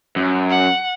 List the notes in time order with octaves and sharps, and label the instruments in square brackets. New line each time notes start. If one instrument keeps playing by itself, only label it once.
[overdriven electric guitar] F#2
[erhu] F#5